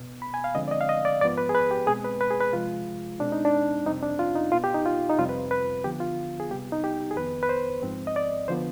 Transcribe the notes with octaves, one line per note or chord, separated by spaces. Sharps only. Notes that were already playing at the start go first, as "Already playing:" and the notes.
Already playing: B2 B3
B5
G#5
F5
D3 F3 G#3 C4 D#5
D5
D#5
F5
D#5
D5
G#2 F3 B3 D5
B4
G#4
B4
G4
B2 G#3 C4 G#4
B4
B4
G#4
B4
C3 F3 G#3 F4
B2 G#3 C4 D4
D#4
D4
F2 C3 G3 C4 D#4
D4
F4
D#4
B2 B3 F4
G4
D#4
F4
D#4
F2 C3 G3 C4 F4
B4
B4
D3 F3 B3 G4
F4
G#4
C3 G3 B3 G4
D#4
G4
G#4
F2 D#3 B3 B4
B4
C5
G#2 F3 C4
D#5
D5
D3 F3 B3 C5